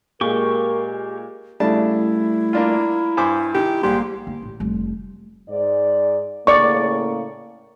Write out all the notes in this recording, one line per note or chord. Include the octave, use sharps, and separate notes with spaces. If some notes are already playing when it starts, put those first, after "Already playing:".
A#2 G#3 G4 A#4 C#6
C#3 G3 A3 D4 E4 A5
A#3 D4 F4
G2 C5 G#5 D6
D#3 G4
A#1 G#2 G3 A#3 G4 C6
A#3
A1
F1 G3
G#2 D5
A2 C#3 A#3 D5 C#6